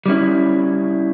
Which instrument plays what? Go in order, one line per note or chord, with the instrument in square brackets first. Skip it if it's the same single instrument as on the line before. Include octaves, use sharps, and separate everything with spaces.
[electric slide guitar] G3 C#4 E4